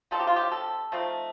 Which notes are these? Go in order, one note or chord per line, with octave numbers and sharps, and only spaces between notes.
F3 A3 C4 D#4 A4
G4
F4
G4
A4
F3 A3 C4 D#4